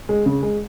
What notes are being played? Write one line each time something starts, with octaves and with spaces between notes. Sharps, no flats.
G#3
C#3
G#3